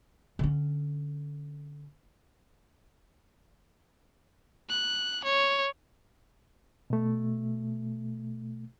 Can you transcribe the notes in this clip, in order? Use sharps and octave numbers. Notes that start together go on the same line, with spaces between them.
D3 C#4
F#6
C#5
B2 A3